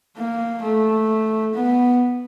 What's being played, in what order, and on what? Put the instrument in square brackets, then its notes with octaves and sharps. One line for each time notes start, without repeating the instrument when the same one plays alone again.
[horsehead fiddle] A#3
A3
B3